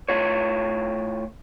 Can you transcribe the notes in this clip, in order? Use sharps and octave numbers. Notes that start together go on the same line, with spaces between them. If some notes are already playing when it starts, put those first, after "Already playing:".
A2 F4 C#5